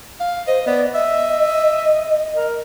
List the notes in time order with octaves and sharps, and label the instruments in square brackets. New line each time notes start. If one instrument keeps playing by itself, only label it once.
[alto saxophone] F5
[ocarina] C5 [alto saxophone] D#5
[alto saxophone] B3 [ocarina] D5
[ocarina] D#5 [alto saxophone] E5
[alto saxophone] A#4